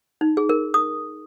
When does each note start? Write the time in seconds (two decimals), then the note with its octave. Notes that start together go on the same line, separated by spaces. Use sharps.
0.21 D#4
0.37 G#4
0.49 A#4
0.74 D#6